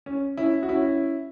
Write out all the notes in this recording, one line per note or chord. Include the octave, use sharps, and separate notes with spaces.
C#4
C#4 E4
F#4
C#4 E4